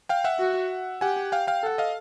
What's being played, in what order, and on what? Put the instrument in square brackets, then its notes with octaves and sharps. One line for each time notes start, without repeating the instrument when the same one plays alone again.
[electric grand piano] F5 G5
E5 F#5
[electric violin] F#4
[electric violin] G4 [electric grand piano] F#5 G#5
[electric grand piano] F5 G5
F5 G5
[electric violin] A4 [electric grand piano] F#5
[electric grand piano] D#5 F5